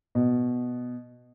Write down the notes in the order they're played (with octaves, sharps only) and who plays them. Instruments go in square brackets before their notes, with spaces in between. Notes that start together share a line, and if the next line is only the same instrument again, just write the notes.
[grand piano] B2